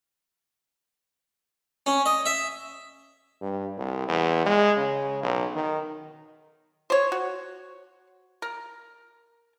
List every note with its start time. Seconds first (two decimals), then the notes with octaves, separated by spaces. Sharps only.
1.86 C#4
2.06 D#5
2.26 E5
3.41 G2
3.77 C2
4.08 E2
4.46 G#3
4.77 C#3
5.23 B1
5.55 D#3
6.90 C5 C#5
7.12 F#4
8.42 A#4